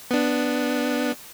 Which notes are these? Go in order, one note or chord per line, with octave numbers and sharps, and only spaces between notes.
B3 D4